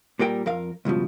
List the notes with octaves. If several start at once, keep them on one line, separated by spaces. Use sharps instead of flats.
A#2 G3 A#4 G5
F2 A#4 F5
C#2 G2 B2 F3